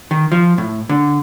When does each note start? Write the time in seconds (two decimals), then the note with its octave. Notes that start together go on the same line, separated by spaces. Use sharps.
0.11 D#3
0.32 F3
0.58 A2
0.89 D3